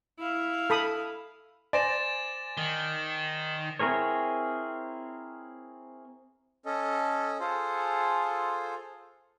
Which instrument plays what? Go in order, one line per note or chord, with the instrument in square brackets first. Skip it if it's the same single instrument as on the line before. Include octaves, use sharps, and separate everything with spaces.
[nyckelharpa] E4 F5
[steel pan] A4 B5 D#6
[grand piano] C5 D5 G#5 [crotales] A6 A#6 E7
[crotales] A6
[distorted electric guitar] D#3 [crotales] G7
[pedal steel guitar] C4 E4 G#4 A#4 C#5
[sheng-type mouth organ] C#4 A4 D#5
F4 G#4 A4 C5